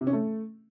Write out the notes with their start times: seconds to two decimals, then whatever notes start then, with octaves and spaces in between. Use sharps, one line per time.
0.01 C3
0.07 C#4
0.13 A3